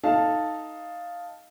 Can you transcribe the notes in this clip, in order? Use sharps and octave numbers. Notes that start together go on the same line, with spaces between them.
D#4 A4 F5 A5